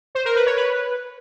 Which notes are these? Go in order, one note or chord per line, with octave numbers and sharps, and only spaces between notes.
C5
A#4
B4
C#5
B4